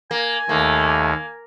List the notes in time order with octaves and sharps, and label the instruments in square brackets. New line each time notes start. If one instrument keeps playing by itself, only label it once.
[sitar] A#3 [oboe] G#5
[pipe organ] D#2 [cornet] A3 [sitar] A#3